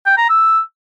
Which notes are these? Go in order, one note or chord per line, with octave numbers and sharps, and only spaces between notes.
G5
A#5
E6